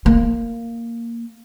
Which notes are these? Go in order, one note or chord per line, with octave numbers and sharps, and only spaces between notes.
A#3